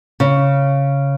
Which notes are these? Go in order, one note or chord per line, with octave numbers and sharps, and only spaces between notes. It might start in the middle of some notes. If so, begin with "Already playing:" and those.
C#3